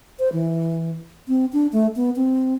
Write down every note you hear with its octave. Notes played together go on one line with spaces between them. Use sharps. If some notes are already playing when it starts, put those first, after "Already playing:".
C5
E3
C4
D4
A3
B3
C4